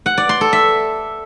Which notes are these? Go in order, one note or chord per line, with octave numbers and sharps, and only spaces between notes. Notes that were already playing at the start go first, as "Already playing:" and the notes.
F#5
D5
C6
A4
E5